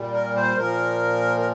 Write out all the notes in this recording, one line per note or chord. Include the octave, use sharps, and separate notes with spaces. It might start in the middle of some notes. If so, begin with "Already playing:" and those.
Already playing: A#2 G3
A#4
C5
A#2 F3 A#4
A#4